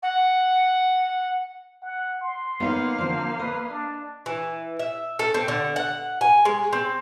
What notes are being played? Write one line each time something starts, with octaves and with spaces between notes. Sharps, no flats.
F#5
F#5
C6
A#3 B3 D#4 C#5 F5
D3 F3 C4 C5
B4 D#5
D4
E3
E5
A4
C4
D3
F#5
G#5
G#3
C4